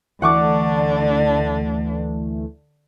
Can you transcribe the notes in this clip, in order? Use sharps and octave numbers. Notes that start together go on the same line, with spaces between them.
D2 D3 E3 A3 D4 F#5 C#6 D6